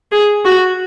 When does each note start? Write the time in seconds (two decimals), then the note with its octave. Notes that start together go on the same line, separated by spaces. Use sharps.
0.12 G#4
0.45 F#4